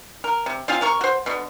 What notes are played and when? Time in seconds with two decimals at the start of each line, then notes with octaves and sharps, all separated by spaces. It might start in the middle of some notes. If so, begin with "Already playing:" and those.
0.24 A#4
0.46 C3
0.68 C4 F4 G#4 F5
0.81 C3 A#4 C#6
1.01 F#4 C5
1.26 B2 D3